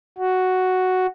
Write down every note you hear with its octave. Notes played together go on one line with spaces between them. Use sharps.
F#4